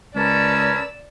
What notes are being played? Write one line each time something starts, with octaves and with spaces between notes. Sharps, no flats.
C#2 C#4 A#4 B4 D5 A5 E6